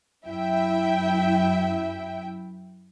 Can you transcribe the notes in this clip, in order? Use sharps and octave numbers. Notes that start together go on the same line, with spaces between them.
F#2 E4 E5 G5